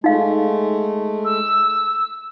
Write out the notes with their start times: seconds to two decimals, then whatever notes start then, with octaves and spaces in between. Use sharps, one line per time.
0.04 G#3 A3 D#4 F5
1.25 E6